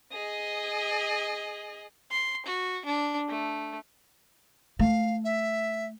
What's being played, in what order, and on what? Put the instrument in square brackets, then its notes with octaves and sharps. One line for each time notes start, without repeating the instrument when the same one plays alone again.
[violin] G#4 D#5
[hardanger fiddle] C6
F#4
D4
A3
[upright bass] A3 [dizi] F5
[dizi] E5